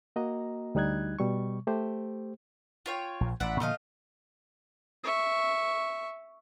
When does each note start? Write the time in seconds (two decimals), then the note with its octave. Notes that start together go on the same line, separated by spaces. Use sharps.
0.16 A#3 F#4 D#5 A#5
0.75 D2 G3 D#4 F#6 G#6
1.19 B2 G3 C#6
1.67 A3 G4 C5
2.86 F4 C#5 G5
3.21 A#1 A#2
3.40 A1 D5 E5 F#5
3.60 A#2 D3 F3 A3 D#5 F5
5.04 E5 C#6